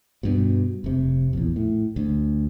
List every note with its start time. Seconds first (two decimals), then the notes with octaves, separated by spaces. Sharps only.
0.23 G2 B2
0.84 F1 C3
1.33 A#1 E2
1.56 A2
1.96 D2